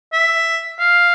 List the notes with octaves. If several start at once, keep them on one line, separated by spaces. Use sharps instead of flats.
E5
F5